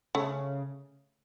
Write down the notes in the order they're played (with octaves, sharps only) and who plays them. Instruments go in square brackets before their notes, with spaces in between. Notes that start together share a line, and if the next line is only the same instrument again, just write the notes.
[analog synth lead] C#3 [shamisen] A3